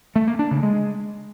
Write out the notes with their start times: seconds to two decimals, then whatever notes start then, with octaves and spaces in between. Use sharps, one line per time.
0.16 A3
0.27 A#3
0.39 D4
0.51 C#3
0.63 G#3